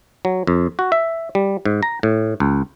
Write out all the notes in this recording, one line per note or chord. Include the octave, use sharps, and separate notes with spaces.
F#3
F2
F#4
E5
G3
G#2
A#5
A2
C#2